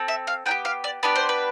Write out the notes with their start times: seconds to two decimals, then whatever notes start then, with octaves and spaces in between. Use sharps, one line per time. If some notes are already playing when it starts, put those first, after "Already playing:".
Already playing: C4 A4
0.08 E5
0.27 F5
0.46 B3 D4 G5
0.51 G4
0.65 F5
0.84 D5
1.03 B3 D4 G4 B4
1.16 C5
1.29 B4